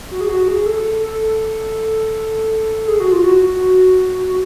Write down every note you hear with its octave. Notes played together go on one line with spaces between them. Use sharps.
F#4
G#4
F#4
G#4
A4
A4
G#4
F#4
F4
F#4
F#4